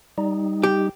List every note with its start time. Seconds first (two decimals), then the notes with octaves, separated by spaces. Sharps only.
0.18 G3 D#4
0.63 G4